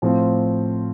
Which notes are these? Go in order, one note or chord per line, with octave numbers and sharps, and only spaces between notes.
A2 F3 C4 F4